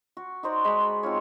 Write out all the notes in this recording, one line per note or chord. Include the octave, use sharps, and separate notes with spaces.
F#4
D#4 F#4 C5 D5
G#3 D#4 B5
D5
C4 D#4 F4 C#5